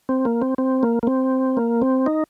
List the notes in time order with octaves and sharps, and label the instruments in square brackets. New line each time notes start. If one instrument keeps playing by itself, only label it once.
[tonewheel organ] C4
A#3
C4
C4
A#3
A#3
C4
A#3
C4
D#4